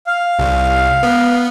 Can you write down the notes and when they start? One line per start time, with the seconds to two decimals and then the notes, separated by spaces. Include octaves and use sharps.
0.07 F5
0.39 C2
1.03 B3